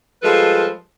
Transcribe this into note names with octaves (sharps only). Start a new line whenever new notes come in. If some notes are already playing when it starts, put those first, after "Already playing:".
F3 G3 G#3 F4 A4 B4